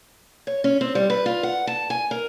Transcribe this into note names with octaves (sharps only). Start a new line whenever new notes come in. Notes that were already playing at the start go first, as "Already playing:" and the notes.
C#5
C#4
C4
G3
B4
F4
F#5
A5
G#5
A#4